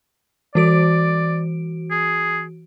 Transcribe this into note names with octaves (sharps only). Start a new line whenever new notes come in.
E3 F#4 D5 D7
G#4